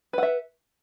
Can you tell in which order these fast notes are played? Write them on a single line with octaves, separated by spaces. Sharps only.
B4 F#5 E5